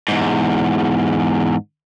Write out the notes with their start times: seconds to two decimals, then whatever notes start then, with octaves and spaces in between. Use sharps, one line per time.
0.08 E2 G#2